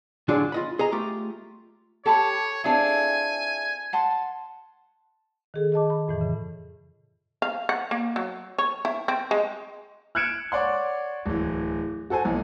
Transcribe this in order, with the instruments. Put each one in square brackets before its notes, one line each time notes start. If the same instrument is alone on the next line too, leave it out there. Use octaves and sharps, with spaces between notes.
[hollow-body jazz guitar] A2 D3 F#3 D4 F4 G#4
F4 D#5 B5
G#4 D#5 G#5 A#5
A3 F4 G4
[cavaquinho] G4 A5 B5 [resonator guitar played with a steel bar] A4 [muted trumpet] C#5
[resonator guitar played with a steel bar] C4 D4 F4 [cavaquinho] E4 G#4 A4 [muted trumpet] G#5
[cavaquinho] F#5 A5 C6
[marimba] D#3 G#4 A4
G#4 D#5 A5 D6
B5
F2 A2 E3
C#3
[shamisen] F5
F#5
A#3
F#3
C#5
E4
C4
G#3
[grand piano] F6 F#6 G#6 C#7 D7 E7
C#5 D5 F#5 C6
D1 E3
F#4 A4 C5 G#5
B1 E3